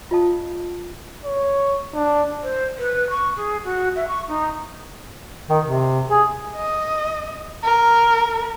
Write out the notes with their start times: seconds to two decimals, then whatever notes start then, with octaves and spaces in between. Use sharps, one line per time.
0.11 F4 C#5 D#5 F5 A5 D#6
1.25 C#5
1.95 D4
2.43 C5
2.78 B4
3.10 C#6
3.36 G#4
3.64 F#4
3.95 E5
4.08 C#6
4.28 D#4
5.50 D#3
5.64 C3
6.10 G#4
6.56 D#5
7.63 A#4